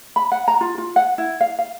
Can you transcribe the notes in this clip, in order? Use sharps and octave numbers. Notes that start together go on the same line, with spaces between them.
B5
F#5
A#5
F4
F4
F#5
E4
F5
F5